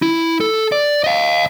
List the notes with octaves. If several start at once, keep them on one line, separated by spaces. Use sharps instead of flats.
E4
A4
D5
D#5 F5